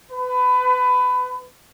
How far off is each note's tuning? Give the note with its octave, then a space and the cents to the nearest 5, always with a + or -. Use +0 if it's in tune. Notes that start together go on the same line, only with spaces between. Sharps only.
B4 +20